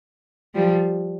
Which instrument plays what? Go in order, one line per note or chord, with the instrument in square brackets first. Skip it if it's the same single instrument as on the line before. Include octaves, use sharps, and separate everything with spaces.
[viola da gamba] F3 G3